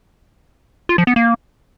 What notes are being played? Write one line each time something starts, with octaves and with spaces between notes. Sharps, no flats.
F4
F3
B3
A#3